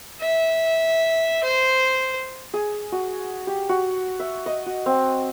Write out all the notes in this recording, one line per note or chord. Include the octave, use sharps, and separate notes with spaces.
E5
C5
G#4
F#4
G4
F#4
E5
D#5
F#4
C4